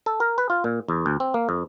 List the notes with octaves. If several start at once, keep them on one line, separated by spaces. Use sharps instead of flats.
A4
A#4
B4
F4
A#2
E2
D2
C4
A#3
F2